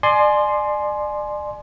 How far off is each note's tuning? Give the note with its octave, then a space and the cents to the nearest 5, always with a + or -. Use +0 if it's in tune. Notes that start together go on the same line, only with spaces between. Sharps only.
D5 +35 G#5 +25 C6 +0